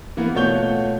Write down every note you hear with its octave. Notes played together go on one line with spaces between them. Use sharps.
E3 A#3 B3
B2 A3 F4 C#5 G6 G7